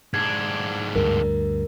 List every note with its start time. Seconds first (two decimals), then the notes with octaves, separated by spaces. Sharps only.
0.14 G#2 D4 G#6
0.95 D2 G2 A#4